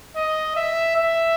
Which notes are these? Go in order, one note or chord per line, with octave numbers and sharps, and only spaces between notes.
D#5
E5
E5